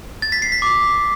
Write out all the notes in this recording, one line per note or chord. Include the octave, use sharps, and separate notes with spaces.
A6
B6
C7
B6
D6